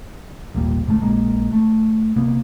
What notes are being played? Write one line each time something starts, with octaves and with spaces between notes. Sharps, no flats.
D#1 G#1 A#2 G3
D2 G#2 G#3 A3
A#1 G#3 A#3
A3
C3 A#3 B3